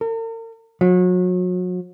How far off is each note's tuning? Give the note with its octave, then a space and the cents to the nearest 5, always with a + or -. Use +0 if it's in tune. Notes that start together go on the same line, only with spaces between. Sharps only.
A#4 -45
F#3 -35